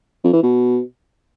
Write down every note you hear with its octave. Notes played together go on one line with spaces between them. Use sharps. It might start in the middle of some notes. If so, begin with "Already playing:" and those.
F2
E3
B2